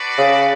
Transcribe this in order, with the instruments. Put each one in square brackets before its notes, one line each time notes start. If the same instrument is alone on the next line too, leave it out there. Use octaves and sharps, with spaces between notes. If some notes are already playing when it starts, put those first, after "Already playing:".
Already playing: [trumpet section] D4 F#4 B4 D5
[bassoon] C#3